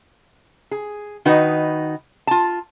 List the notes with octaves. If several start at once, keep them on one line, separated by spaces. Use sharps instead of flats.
G#4
D#3 D#4 F#4 B4
F4 A5